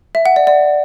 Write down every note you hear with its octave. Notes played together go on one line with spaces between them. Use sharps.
E5
F#5
D5
D5